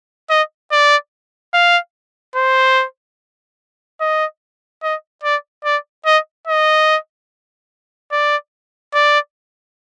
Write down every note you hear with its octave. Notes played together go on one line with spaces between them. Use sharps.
D#5
D5
F5
C5
D#5
D#5
D5
D5
D#5
D#5
D5
D5